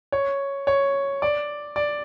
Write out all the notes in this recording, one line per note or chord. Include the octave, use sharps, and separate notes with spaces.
C#5
C#5
D5
D5